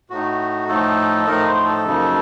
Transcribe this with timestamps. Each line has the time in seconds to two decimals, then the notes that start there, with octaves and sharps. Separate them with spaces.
0.10 A2 A3 D#4 F#4
0.68 A2 F3 A3 D#4 A4
1.26 A2 F3 A3 D#4 A#4
1.45 C5
1.65 A4
1.84 F#2 C#3 F3 A#3 D#4